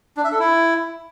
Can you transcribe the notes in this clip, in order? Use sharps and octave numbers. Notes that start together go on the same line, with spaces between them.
D4
E5
A4
E4